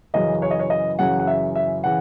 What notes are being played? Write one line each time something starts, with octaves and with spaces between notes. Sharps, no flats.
F#2 C#3 E3 D#5
C#5
D#5
C#5
D#5
F#2 C#3 E3 F#5
F#5
E5
E5
C#3 E3 F#5